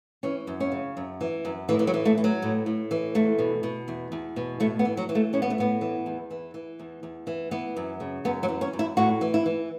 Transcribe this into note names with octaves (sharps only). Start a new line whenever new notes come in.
E3 C#4
F#2
C#4
C#3
F#2
E3
F#2
A2 E3
E3
F#3
E3
A3
E3
F#3
A2
A2
E3
E2 A3
B2
B2
E2
E2
B2
A2 A3
B3
E3
F#3
E3
A3
A2 C#4
B3
A3
A2 B3
E3
E2
E3
E3
E2
E2
E3
E3 B3
F#2
C#3
F#2 B3
F#3
E3
C#4
F#2
E4
A2 F#4
E3
E4
E3